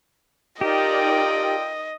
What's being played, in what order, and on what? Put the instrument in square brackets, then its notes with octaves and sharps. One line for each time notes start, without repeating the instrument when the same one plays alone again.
[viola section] D#4 A#4 D5 [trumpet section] F4 A4 G5 [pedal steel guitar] G4 [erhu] D#5